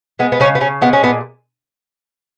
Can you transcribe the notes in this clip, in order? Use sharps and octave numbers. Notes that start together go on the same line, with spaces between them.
G#3 B3
B3
C#3 C#4
B3
C#3 C#4
G#3 B3
C#4
A#2 B3